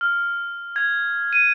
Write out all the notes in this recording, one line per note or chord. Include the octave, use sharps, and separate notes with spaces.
F6
G#6
D#7